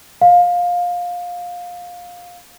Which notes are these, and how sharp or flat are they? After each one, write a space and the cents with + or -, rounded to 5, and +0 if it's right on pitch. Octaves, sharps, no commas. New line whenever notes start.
F5 +20